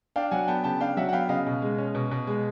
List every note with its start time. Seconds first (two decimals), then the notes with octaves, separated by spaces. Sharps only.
0.16 D4 F5 G5
0.31 F#3 F#5 G#5
0.48 B3 G5 A5
0.64 C#3 G5 A5
0.80 D4 F5 G5
0.97 F#3 E5 F#5
1.09 F#5
1.13 B3 F5 G5
1.29 C#3 D#5 F5
1.46 B2
1.62 G#3
1.78 C#4
1.95 B2
2.11 B2
2.27 G#3